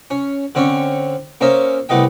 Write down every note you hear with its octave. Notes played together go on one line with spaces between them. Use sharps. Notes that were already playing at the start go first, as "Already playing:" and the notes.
C#4
D3 C4 C#4 C#6
A#3 C#4 C5 D#5 E5
C2 A3 B3 D#5 G5